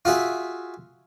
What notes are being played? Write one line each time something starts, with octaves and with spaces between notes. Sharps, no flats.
F4 F#4 G#4 E5